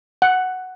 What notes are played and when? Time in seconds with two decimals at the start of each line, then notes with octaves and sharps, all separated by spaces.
0.22 F#5